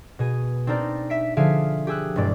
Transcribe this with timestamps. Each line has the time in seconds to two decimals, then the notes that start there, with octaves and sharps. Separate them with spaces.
0.19 B2 G#4 D#7
0.67 C4 D4 D#4 A#4 D5
1.10 E5 B6 D7
1.37 D3 F3 G#4 E5 F5 D7
1.87 G4 G#4 E6 F#6
2.16 E1 G2 G#3 D5 D6